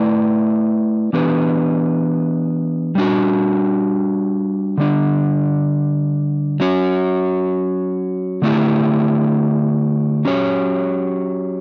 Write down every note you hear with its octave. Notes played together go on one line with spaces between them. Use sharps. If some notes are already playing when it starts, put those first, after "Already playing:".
Already playing: A3 E4 B4 D5
E3 B3 D4 G4 B4
G3 D4 F#4
D3 G3 D4
F#3 C#4 F#4 C#5
D3 A3 E4 G4
F#3 C#4 G4 C#5